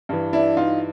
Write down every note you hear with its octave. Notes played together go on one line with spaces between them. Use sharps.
G2 E3
D4 E4
D#4 F4